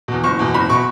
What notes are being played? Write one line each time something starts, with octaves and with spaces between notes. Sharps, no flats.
E2 B2
F#1 C#6
E2 B2
F#1 B5
B2 C#6